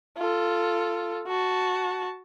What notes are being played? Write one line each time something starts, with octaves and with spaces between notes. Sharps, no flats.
F4 A4
F#4 A5